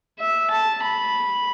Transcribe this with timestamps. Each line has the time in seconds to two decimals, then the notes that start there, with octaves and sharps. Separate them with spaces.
0.19 E5
0.50 A5
0.82 B5